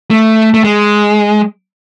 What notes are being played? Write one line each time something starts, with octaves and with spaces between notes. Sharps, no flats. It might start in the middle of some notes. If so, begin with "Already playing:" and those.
A3
A3
G#3